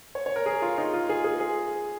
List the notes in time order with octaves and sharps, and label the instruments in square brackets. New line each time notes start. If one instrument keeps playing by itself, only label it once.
[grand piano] C#5
C#5
A#4
G#4
F4
D#4
F4
G#4
G#4
G#4